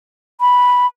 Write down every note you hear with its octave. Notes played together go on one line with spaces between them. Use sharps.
B5